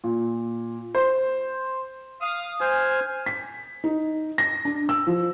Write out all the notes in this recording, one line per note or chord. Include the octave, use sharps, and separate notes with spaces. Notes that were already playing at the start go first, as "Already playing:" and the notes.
A#2
C5
F5 D#6
C5 G#5 F6
B6
D#4
A#6
D4
E6
F3